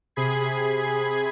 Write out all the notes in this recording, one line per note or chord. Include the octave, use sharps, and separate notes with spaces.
C3 G#4 B5 G#6 C7